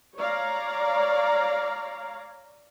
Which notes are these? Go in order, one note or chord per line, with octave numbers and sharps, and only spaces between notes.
C#5 D5 F5 A#5